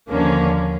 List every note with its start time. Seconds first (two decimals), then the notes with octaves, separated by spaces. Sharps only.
0.09 D#2 D3 F3 A#3 C#4